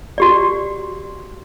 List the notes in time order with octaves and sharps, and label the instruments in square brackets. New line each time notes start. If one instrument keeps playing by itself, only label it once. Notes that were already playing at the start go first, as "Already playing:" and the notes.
[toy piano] F#4 G4 D5